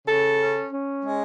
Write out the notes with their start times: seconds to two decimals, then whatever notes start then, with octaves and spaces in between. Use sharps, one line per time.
0.07 C#3 A4
0.40 C#4
0.72 C#4
1.05 G#3